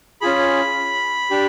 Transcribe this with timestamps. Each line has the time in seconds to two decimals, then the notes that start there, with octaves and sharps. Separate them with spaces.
0.21 C#4 F4 G#4 B5
1.31 D4 G4